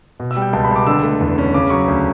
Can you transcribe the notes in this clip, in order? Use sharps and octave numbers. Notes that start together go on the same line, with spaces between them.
B2
E6
G3
G5
C#2 A5
B5
C#2
D6
D3 E6
A3
E2
C#4
C#3 D6
F#3 C#6
D2